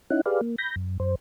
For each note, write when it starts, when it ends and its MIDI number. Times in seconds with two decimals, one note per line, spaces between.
0.11 0.21 61
0.11 0.21 63
0.11 0.21 64
0.11 0.21 78
0.26 0.41 67
0.26 0.41 68
0.26 0.41 71
0.26 0.41 74
0.26 0.41 77
0.41 0.56 58
0.58 0.75 83
0.58 0.75 91
0.58 0.75 94
0.76 0.97 42
1.00 1.15 42
1.00 1.15 72